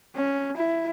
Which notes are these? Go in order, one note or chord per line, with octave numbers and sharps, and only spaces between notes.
C#4
E4